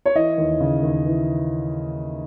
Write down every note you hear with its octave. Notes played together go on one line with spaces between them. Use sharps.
C#5
E3 D#5
D#2
C#3
D#2
E3